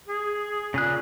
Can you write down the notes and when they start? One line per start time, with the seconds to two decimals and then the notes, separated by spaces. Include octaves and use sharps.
0.08 G#4
0.74 A#2 C#3 G#4 F#6